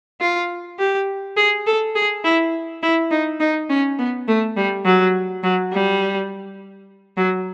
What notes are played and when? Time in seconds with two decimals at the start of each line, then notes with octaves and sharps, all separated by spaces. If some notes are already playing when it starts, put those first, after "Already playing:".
0.21 F4
0.79 G4
1.37 G#4
1.66 A4
1.95 G#4
2.24 E4
2.82 E4
3.11 D#4
3.40 D#4
3.69 C#4
3.98 B3
4.28 A3
4.57 G3
4.85 F#3
5.43 F#3
5.72 G3
7.17 F#3